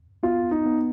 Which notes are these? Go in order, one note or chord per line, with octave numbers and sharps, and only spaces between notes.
B3 F4
D#4
B3